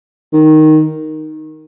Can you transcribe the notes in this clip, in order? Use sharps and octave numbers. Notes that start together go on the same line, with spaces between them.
D#3